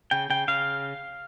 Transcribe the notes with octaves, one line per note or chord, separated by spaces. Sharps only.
C#3 G5
C#3 G5
C#3 F5